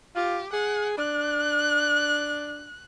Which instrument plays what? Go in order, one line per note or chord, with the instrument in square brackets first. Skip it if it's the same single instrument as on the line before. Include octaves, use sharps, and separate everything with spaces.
[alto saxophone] F4 [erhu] G4
[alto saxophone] G#4 [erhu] F#5
[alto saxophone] D4 [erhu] F#6